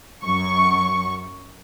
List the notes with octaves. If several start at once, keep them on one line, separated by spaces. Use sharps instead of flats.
F#2 C#6